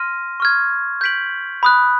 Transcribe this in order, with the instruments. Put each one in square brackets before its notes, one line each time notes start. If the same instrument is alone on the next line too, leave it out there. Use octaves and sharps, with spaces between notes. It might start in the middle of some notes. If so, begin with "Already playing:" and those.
Already playing: [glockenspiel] C6 F6 A#6 D#7
C#6 F6 G#6
G6 B6 D7 F#7
B5 D#6 F#6